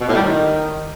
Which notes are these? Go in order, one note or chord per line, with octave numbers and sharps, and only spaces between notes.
B2
A2
G3
D#3